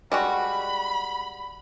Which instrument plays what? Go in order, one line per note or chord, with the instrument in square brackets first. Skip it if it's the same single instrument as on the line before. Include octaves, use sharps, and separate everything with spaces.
[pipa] G3 G#3 F#4 [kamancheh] B5